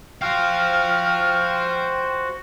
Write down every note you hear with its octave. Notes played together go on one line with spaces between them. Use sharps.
F#4 C5 F5 G5 F6